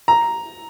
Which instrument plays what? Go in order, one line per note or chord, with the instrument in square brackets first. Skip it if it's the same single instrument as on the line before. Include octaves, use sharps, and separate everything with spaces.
[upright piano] A#5